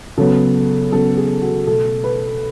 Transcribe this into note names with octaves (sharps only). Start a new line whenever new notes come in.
C#3 F#3 B3 A4
C#3 F#3 B3 A4
G#4
F#4
B2 A3 A4
B4